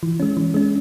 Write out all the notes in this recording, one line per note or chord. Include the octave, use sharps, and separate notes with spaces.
E3
G#3 C#4
E3
G#3 C#4